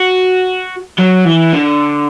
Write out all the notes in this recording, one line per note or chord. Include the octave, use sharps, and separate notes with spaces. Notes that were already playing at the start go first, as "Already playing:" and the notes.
Already playing: F#4
F#3
E3
D3